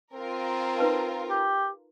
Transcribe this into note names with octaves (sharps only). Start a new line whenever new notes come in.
C4 F4 A#4
D#4 B4 A5
G4